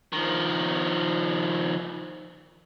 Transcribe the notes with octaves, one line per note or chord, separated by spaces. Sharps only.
D#3 F3